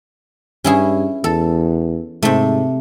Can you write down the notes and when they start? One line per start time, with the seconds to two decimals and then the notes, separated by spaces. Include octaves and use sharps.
0.64 G2 C#4 E4 G#4
1.24 E2 A4
2.23 G#2 C3 A3